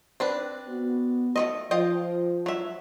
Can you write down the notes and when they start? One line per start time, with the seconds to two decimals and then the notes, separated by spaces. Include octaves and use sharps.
0.20 C4 D4 B4
0.67 B3 F#4
1.36 A3 C4 D#5
1.71 F3 F4 D#5 G5
2.46 F#3 E5